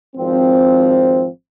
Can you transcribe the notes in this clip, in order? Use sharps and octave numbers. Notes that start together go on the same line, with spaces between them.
G#1 F3 C4